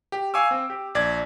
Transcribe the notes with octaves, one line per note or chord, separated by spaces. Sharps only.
G4
F5 G#5 C#6 D6 E6
C4
G4
A#1 D5 G#6